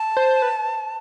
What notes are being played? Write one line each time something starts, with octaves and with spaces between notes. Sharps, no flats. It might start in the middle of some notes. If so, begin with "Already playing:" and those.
Already playing: A5
C5
B4